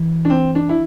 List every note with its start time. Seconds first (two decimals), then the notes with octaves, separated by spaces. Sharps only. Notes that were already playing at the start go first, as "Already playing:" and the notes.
Already playing: E3
0.25 D4
0.30 C4
0.55 D4
0.69 E4